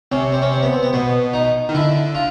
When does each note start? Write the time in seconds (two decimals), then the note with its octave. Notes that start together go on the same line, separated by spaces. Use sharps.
0.11 C3 C#4
0.32 C4
0.42 C#4
0.52 C4
0.63 B3
0.73 C4
0.83 B3
0.93 B2 B3
1.34 D#4
1.69 D#3
1.75 D3 E4
2.15 F4